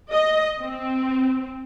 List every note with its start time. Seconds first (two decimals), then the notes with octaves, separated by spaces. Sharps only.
0.13 D#5
0.62 C4